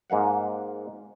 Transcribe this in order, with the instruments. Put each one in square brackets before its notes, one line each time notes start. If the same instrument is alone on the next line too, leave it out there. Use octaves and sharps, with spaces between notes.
[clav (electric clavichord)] G#2 A#3 F5 F#5